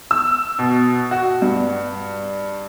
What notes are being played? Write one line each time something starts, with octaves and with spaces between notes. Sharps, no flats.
E6
B2
F#4
G2